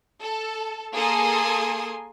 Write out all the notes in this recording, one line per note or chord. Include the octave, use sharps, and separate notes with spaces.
A4
A#3 G#4 A4 G#5 C6 D#6